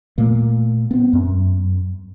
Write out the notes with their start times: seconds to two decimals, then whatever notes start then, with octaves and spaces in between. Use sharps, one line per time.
0.18 A#2 A3 A#3
0.91 B3 C4
1.13 F#2